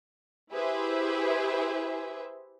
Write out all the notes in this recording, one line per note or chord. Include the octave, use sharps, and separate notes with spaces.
E4 G4 G#4 B4 C5 E5